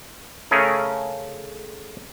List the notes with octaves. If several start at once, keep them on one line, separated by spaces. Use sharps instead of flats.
C#3 A3 C#4 G#4 A#4